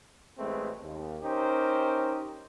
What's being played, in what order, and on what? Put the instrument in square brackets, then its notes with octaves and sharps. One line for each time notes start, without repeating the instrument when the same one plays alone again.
[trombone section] A1 G#3 A3 C4 B4
D#2
C#4 D#4 G4 A#4 C5